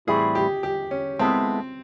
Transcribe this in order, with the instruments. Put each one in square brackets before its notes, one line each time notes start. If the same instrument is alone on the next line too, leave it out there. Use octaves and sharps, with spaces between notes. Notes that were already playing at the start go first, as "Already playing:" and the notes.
[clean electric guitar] A2 E3 G3 C4 E4 [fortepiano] G#4
[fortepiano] G4
G4
C#4
[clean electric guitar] G#3 B3 E4 A4 [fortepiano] C4